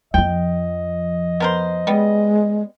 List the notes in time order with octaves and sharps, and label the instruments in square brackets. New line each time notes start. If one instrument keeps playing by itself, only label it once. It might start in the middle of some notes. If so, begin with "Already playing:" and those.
[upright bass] F2 F3 [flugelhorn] D#5 [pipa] G5
[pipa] B3 A#4 C5
[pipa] G3 B3 [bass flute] G#3